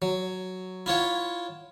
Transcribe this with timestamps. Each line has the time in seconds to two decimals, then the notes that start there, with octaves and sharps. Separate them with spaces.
0.02 F#3
0.86 E4 F4 C#5 F#5